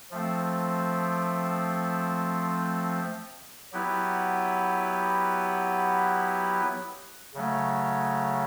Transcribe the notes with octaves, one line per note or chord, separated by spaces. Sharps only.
F3 A3 C4
F#3 B3 E4 G4 B4
C#3 F#3 A3